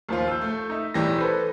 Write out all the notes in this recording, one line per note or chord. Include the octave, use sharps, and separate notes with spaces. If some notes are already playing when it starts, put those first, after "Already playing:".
D#2 F3 F4
E6 G6
A3
D#4 E5
B1 A2 E3 G3 G4 A#6
A4 B4 C5